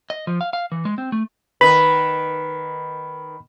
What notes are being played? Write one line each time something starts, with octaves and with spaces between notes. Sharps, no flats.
D#5
F3
F5
F5
E3
G#3
C4
A3
D#3 B4 B5